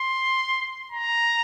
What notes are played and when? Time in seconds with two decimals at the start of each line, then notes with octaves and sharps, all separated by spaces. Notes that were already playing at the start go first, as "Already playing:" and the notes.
Already playing: C6
0.92 A#5